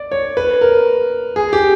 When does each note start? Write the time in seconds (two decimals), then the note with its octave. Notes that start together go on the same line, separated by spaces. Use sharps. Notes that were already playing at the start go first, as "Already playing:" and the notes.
Already playing: D5
0.12 C#5
0.37 B4
0.61 A#4
1.36 G#4
1.53 G4